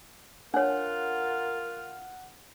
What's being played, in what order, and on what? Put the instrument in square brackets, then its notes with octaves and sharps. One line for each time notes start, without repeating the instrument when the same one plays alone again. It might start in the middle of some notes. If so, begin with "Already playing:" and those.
[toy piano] D4 C#5 [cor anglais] F4 [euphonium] A#4 [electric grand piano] F#5